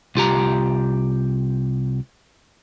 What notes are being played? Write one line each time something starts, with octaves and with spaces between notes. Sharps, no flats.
C2 F4 G4 A#5